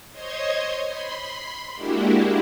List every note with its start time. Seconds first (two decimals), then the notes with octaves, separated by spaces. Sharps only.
0.12 C5 C#5 D#5 C6 G#6
0.87 B5 C6
1.76 G#3 A#3 D4 E4 F#4 G4